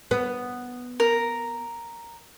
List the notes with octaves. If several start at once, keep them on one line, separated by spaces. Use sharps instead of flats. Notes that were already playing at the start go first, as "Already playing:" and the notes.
B3
A#4